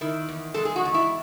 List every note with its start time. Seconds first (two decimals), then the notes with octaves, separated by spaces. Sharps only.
0.01 D#3 E4
0.29 E2
0.54 G#3 A4
0.65 G#4
0.76 F#4
0.85 E2
0.94 E4